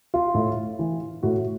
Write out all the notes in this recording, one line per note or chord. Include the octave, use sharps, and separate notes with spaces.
F4
A2
E3
A2 F#4